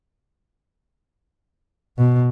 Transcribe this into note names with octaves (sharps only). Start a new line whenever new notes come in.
B2